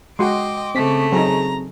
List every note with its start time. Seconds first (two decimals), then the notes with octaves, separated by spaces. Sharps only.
0.19 G#3 F#4 D#5 G5 C6 D6
0.75 C#3 A3 C4 B6
1.12 F#3 C4 D#4 G#4 A#5